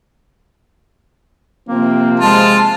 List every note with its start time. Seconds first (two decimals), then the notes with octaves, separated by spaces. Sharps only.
1.69 C3 F3 A#3 C4
2.20 G#3 F4 A5